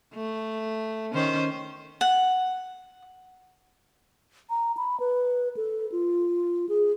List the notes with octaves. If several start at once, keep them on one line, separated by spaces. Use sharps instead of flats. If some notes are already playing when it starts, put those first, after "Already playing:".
A3
D#3 C#4 C5
F#5
A#5
B5
B4
A4
F4
G#4